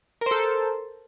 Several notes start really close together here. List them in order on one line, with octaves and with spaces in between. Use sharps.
A#4 C5 A4